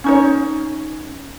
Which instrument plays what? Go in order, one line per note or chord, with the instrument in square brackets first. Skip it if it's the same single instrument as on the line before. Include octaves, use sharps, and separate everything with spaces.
[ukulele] C#4 D#4 C#5